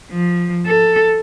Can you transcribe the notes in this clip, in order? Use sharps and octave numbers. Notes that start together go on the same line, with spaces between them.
F3
A4